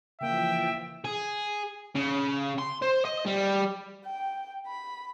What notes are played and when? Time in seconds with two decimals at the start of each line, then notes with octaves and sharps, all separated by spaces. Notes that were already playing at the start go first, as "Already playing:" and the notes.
0.21 C#3 E3 F3 A#3 F4 E5 G5
1.05 G#4
1.95 C#3
2.59 C6
2.82 C5
3.05 D#5
3.26 G3
4.05 G5
4.67 B5